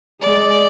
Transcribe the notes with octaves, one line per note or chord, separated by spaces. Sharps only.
G#3 D5